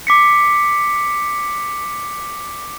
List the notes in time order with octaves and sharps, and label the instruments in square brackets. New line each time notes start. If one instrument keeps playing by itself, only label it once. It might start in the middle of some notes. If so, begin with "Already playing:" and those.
[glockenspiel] D6 B6 C#7